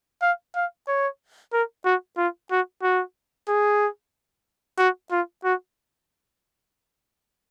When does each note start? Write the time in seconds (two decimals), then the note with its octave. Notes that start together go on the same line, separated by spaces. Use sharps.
0.22 F5
0.56 F5
0.88 C#5
1.53 A#4
1.85 F#4
2.17 F4
2.51 F#4
2.83 F#4
3.48 G#4
4.78 F#4
5.11 F4
5.44 F#4